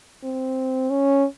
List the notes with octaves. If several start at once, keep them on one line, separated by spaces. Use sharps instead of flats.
C4
C#4